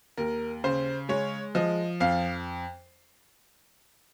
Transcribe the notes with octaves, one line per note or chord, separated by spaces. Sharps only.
D#2 A#4
C#3 C5
G#3 C#5
F3 D#5
F2 F5